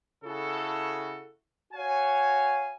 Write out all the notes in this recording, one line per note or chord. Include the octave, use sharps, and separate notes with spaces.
C#3 E4 F#4 A4
F#4 C#5 F5 G#5